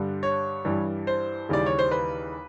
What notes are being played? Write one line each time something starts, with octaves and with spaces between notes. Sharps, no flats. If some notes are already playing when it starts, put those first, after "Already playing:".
Already playing: G2 D3 G3
C#5
G2 E3 G3
C5
D#2 C#3 E3 G3 D5
C#5
C5
B4